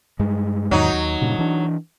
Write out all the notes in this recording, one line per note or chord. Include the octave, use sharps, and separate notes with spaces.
G2 G#3
E2 G#2 D#3 F#3 D#4
D#2
G2 A#2 C#3
E3 D4